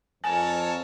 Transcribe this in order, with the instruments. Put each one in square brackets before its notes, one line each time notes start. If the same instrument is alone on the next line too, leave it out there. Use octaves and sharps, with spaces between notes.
[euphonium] F2 [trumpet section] A4 A#4 C#5 [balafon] G#5 [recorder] A5